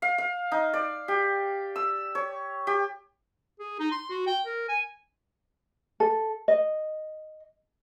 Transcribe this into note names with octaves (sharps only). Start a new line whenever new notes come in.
F5
F5
D#4
D5
G4
E6
C#5
G4
G#4
D#4
C6
F#4
G5
A#4
G#5
A4
D#5